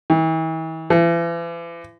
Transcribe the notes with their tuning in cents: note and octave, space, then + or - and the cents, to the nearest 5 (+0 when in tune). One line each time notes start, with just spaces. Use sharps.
E3 -40
E3 +40